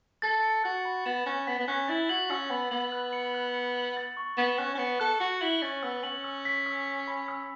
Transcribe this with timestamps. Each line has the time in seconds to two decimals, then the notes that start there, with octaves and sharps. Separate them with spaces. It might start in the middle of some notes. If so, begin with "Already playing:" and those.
0.22 A4 A6
0.43 C#7
0.64 F#4 F#6
0.85 B5
1.05 B3 E7
1.26 C#4 F#6
1.47 B3 B6
1.59 B3
1.67 C#4 F#6
1.88 E4 A6
2.09 F#4 F#7
2.30 C#4 E6
2.50 B3 B5
2.71 B3 F#7
2.92 F#6
3.13 C#7
3.34 F#6
3.54 C#7
3.75 F#7
3.97 A6
4.17 C#6
4.37 B3 E7
4.58 C#4 F#6
4.75 C#4
4.79 B3 C#7
5.00 A4 F#6
5.20 F#4 C#7
5.41 E4 F#7
5.62 C#4 A6
5.83 B3 E6
6.03 C#4 F#7
6.24 E6
6.45 B6
6.66 E6
6.87 B6
7.08 B5
7.28 E6